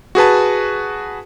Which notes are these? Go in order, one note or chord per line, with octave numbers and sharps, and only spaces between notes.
F#4 G#4 B4 A5